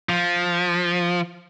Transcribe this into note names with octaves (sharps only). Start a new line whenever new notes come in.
F3